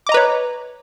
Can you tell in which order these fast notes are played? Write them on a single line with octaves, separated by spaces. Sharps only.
D6 D#5 A#5 B4 C#5